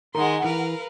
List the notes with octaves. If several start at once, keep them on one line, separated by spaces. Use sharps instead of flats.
D#3 G#3 A#4 F#5 C6
E3 A#4 B4 F5